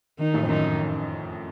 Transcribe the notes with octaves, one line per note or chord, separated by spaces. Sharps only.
D#3 D#4
A1 A2
F2
F#2 D#3 D#4